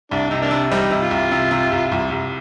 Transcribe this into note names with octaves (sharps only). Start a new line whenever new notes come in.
C2 D4
C3 D#4
A#3 D4
C3
G3 C4 D#4
C3
F4
C2
C3
C3
C2
C2
C2